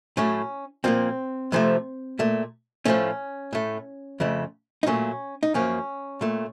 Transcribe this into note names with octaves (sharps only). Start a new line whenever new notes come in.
A2 F#3 A3 C#4
A#2 F3 A#3 C4
F2 C3 F3 A3
A#2 A3
A2 F3 A3 C#4
A2 A3
F2 C#3 A3
D#4
A#2 F#3 A3 C#4
D#4
F#2 F3 A#3 C#4
A#2 A3